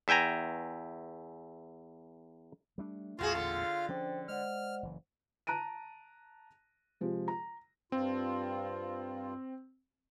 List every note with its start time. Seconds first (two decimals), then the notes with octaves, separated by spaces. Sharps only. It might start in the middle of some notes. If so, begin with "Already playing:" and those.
0.08 E2 E5 G5 G#5 A#5
2.78 G3 A3 D4
3.19 A1 E2 A#2 A3 F4 F#4 G#4 F5
3.35 D3 A4
3.89 F3 C#4 D4 C5 G5
4.29 G#3 C5 D5 F#5 F6
4.83 F#1 E3
5.47 A5 A#5 F#6 D7 D#7
7.01 C3 F3 G#3
7.28 A#5
7.92 G2 C4 F4